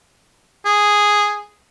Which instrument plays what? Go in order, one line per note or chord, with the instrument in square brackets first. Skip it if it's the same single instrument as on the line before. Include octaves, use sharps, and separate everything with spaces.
[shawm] G#4